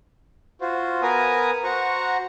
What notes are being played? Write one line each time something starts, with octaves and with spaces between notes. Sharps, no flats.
F4 F#4 C5
B3 A#4 B4 G#5 A#5 D#6
F#4 C5 F#5 A#5 C#6